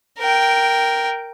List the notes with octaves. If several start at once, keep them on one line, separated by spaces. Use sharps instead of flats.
A#4 G5